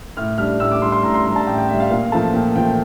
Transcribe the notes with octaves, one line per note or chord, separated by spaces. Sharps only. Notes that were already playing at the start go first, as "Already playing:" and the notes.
A2 F6
G3 D4 F6
A2 E6
D6
G3 D4 C6
C6
A2 A#5
C6
G3 D4 A#5
A5
A2 G5
G5
D4 E5
G3
F5
A#2 F5
F3 A3 A5
A#2 G5
F3 A3 G5